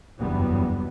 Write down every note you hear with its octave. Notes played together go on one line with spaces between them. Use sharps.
F#1 E2 G2 F#3 G3 B3